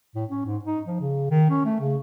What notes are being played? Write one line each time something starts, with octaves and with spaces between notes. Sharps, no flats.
A2
C#4
G#2
D#4
F3
C#3
D#3
C#4
A3
C#3